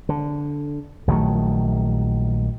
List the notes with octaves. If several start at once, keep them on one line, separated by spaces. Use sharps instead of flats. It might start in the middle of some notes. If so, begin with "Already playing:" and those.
D3
A#1 D#3 F#3 A3